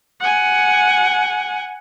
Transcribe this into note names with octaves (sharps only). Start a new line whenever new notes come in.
F#5 G#5